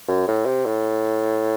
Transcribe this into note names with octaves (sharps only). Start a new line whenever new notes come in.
F#2
A2
C3
A2